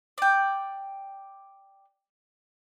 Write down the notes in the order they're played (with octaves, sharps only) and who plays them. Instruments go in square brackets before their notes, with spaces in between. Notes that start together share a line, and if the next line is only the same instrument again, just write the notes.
[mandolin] D5 G5